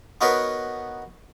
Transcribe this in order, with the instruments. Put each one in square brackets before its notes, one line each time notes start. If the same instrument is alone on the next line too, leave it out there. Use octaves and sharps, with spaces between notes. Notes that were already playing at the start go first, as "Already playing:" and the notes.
[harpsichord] B3 D#4 F#4 A#4 B4 C#5